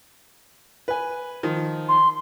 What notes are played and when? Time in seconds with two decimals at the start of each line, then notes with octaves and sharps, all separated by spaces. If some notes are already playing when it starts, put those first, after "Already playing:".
0.88 B4 G#5
1.43 D#3 F3
1.89 C6